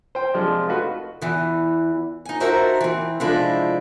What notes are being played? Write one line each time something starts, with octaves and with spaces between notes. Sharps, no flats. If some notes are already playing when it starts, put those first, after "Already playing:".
C5 G5
C3 F3 G#3 D4
A3 D#4 F4 F#4 B4
E2 E3
D#4 G#5
D#4 F#4 A4 A#4 C5 E5
E3 C4
C3 F3 G#3 D4 E4 A4